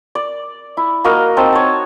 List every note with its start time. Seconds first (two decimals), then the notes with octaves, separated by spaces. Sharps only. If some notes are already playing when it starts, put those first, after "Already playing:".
0.15 D5
0.77 E4
1.04 A#3 F#4 A#4 D#5
1.37 C4 D#4 D#5 A5
1.53 C#5 A5